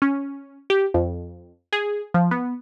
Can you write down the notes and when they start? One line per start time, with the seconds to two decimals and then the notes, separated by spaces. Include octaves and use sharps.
0.02 C#4
0.70 G4
0.94 F2
1.73 G#4
2.14 F3
2.31 B3